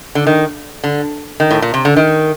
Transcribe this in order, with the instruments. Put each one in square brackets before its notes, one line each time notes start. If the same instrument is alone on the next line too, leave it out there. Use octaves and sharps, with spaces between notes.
[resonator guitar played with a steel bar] D3
D#3
D3
D#3
A2
A#2
C3
D3
D#3